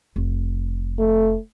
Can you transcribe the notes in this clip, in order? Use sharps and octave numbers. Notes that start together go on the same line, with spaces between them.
F1
A3